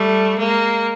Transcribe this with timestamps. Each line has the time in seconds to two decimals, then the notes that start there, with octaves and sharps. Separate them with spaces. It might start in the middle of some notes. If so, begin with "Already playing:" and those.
Already playing: G3 A3
0.38 G#3 A#3